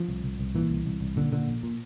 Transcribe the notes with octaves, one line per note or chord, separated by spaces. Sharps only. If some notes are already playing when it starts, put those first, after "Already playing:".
Already playing: F3
C2
C2
C2
A#2 E3
C2
C2
C2
A#2 D3
A#2 D3
A#1
A#2